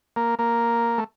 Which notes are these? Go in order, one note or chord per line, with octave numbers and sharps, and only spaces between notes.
A#3
A#3
A3